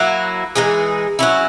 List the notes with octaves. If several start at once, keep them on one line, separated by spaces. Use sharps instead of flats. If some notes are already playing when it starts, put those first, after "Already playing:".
Already playing: F#3 A#3 E4
E3 G#3 D#4 G#4
F#3 C#4 E4